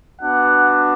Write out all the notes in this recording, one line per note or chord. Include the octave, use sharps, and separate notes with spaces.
B3 D4 F#4 F#5